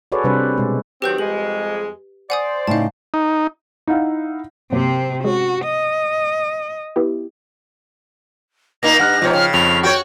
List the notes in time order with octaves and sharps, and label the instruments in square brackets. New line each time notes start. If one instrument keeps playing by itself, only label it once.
[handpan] F#4 G#4 A4 B4 C#5 D5
C3 G3 D4 B4 C5
B2 G#3
[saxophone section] D#3 F#3 C4 [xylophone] G4 B4 G6
[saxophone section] F2 G3 G#3 [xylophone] F#7
[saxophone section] C5 D5 [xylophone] F#5 G#5 D#6
[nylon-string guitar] A2 C#3 D#4 [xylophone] F5 A5
[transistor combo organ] D#4
[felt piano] D#4 E4 F5 F#5
[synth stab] G1 F#3 A#3 [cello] C3 C4
[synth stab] G#3 C#4 [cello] F#4
[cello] D#5
[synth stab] B3 E4 G4
[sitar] A#2 A#3 D#4 [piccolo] A#6
[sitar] G2 [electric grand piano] F#5 F6 F#6
[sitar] G#2 B2 [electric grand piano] F3 C#5
[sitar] C#3 [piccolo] F6
[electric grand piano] F2 [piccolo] F7
[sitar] F#4 C#5 [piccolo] G5